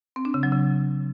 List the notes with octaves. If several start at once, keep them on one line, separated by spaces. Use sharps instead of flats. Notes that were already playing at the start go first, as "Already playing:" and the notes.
C4
D4
C#3
F#3
C#3